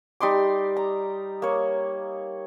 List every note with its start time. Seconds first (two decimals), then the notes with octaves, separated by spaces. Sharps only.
0.20 G3 D#4 C6 D6
0.77 A#5
1.42 A#3 C#5